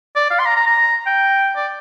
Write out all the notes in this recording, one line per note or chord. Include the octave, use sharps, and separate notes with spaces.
D5
F5
C6
A#5
A#5
A#5
G5
D5